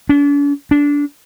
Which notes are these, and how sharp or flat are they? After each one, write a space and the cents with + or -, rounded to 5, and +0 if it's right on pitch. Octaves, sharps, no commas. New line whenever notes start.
D4 -45
D4 -20